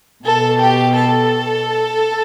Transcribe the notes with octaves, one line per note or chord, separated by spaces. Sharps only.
B2 A4
G4
A4